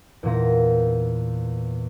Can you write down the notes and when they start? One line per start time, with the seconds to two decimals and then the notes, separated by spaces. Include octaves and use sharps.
0.23 E2 A#2 A#6